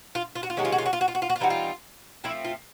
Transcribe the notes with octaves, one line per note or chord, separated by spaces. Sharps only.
F4
F4
F#4
F4
C3 D#3 G#3 C#4 F#4
F4
F#4
F4
F#4
F4
F#4
F4
F#4
F4
F#4
F4
E3 G3 C4 D#4 F#4
F4
F3 A3 C4 E4
F4